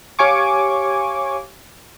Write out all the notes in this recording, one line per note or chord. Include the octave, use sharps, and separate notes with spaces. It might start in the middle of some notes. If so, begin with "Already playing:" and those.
G4 C#5 F5 G#5 C#6 D6